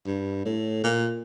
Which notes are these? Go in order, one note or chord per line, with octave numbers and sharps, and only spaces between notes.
G2
A2
A#2